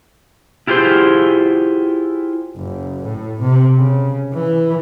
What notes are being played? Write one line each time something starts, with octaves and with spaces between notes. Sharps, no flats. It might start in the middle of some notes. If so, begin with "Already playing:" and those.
E4 F4 G4 G#4 C5
F#1
A2
C3
C#3
E3